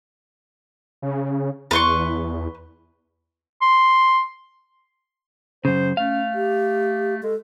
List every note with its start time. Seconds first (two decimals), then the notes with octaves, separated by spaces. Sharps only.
1.02 C#3
1.71 E2 B4 C6 C#6
3.61 C6
5.65 F#2 C#3 C5
5.97 A3 C#4 F5
6.35 G4
7.23 G#3 A4